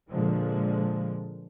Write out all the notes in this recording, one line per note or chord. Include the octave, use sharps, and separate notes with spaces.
A#2 D3 F3 G#3